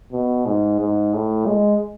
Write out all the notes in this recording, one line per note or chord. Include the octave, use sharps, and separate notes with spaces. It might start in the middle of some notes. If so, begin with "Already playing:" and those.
B2
G#2
G#2
A2
G#3